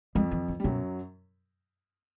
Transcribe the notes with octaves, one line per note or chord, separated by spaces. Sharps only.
F2 F3 G#3
E3
E3
G3
F#2 B2 F#3